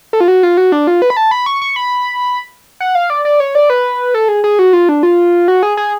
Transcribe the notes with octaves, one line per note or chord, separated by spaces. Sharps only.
A4
F4
F#4
F4
F#4
D4
F4
B4
B5
A5
B5
C#6
C#6
B5
F#5
F5
D5
D5
C#5
D5
B4
A4
G#4
G#4
F#4
F4
D4
F4
F#4
G#4
G#4